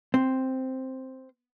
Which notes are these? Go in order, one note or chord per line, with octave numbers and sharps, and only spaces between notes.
C4